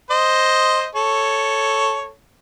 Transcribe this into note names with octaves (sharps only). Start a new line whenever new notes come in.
C5 D#5
A4 C#5